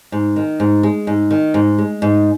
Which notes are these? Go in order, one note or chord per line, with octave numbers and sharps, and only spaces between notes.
G#2
D#3
G#2
G#3
G#2
D#3
G#2
G#3
G#2